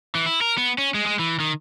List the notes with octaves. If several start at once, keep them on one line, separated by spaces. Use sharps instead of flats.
E3
E4
A#4
B3
C#4
G#3
G#3
E3
D#3